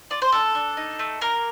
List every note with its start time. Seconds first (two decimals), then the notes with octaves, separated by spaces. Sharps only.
0.10 F4 D5
0.22 C5
0.32 D4 A4
0.55 D4
0.77 D#4
0.99 A3
1.21 A#3 A#4